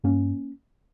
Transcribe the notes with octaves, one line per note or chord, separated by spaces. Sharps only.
G2 A#3 C#4